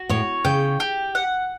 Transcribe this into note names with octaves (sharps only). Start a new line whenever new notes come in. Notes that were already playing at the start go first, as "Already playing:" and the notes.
Already playing: F#4
A2 C#5
C#3 G5
G4
F#5